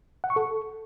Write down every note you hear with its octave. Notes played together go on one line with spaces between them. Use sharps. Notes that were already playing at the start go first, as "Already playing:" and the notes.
F#5
C#6
A4